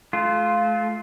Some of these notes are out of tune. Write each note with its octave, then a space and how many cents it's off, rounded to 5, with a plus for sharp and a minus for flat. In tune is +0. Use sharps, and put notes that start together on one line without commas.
A3 -40 F4 +0